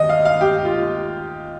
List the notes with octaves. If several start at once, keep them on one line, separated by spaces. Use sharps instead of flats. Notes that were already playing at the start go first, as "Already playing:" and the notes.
Already playing: D#2 D#5
F5
F5
G4
F4